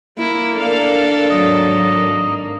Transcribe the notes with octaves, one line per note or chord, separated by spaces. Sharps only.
A#3 E4
D4 A4 A#4 D5 F5
G#1 F#3 A#3 D#5